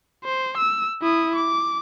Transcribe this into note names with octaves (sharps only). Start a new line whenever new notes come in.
C5
E6
E4 D#6
D6